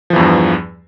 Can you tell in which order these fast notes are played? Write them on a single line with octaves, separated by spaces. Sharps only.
F3 E3 E2 G2